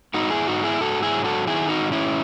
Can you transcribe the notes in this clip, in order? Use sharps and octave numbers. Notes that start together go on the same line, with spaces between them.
G#2 D#4 F#4
E4 G#4
G#2 D#4 F#4
E4 G#4
G#2 F#4 A4
E4 G#4
F#3
F#4 A4
D#3 E4 G#4
D#4 F#4
G#2
C#4 E4